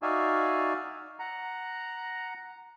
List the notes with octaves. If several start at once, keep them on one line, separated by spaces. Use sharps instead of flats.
D#4 F#4 D5 E5 F5 G#5
F#5 A#5